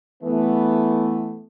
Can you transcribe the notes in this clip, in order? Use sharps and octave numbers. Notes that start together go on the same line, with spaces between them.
E3 A3 B3